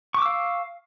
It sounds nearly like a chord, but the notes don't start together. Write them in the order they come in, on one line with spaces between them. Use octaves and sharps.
C#6 D6 E6 F5